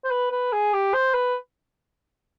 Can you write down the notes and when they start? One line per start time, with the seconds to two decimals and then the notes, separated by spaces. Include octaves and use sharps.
0.04 C5
0.11 B4
0.31 B4
0.53 G#4
0.74 G4
0.94 C5
1.14 B4